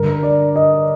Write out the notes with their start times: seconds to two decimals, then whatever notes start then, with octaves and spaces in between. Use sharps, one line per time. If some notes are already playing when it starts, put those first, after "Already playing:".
Already playing: G2 D3 A#4
0.23 D5
0.56 D#5